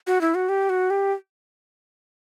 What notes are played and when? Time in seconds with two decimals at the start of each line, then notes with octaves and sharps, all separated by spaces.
0.07 F#4
0.21 E4
0.35 F#4
0.49 G4
0.70 F#4
0.90 G4